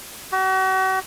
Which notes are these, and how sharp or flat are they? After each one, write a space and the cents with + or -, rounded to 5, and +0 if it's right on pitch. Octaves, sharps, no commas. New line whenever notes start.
F#4 +40